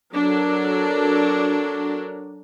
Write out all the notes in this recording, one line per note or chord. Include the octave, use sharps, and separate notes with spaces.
F#3 D4 A4 A#4